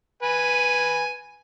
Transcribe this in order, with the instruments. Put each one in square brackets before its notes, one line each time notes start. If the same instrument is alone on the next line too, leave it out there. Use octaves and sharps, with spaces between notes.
[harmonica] B4 G#5